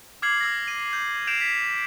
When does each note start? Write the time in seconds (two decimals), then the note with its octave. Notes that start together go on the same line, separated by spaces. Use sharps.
0.22 D6 F6 G#6 C7 F#7
0.41 E6 G#6 A#6
0.68 D#7
0.93 G6
1.27 G6 C7 D7 E7 F7
1.41 B6